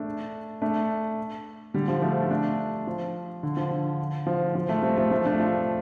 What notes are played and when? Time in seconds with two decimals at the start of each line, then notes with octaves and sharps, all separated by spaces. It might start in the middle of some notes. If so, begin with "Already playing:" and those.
Already playing: A3 D4
0.61 A3 D4
1.74 D3 G3
1.88 F3
2.02 F3 A3
2.30 A3 D4
2.87 F3
3.43 D3
3.57 F3
3.71 D3
4.27 F3
4.55 F3
4.69 F3 A3
4.83 G3 C4
4.98 F3 A3
5.11 F3 A3
5.25 A3 D4
5.39 C4 F4